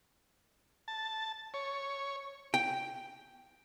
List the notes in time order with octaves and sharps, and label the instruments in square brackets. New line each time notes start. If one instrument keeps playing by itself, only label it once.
[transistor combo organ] A5
C#5
[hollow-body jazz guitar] G5